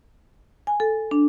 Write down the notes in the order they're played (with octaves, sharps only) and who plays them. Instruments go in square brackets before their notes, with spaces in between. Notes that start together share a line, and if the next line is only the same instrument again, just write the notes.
[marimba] G#5
A4
D4